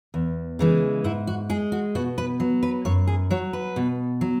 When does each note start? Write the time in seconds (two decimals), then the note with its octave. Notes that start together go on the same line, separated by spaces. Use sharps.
0.14 E2
0.59 C#3 E3 G#3
1.04 G#2 E4
1.27 F#4
1.49 G#3 G#4
1.72 F#4
1.95 B2 F#4
2.18 B4
2.40 F#3
2.63 B4
2.85 F#2 C#5
3.07 G#4
3.30 F#3 C#5
3.53 B4
3.76 B2
4.21 F#3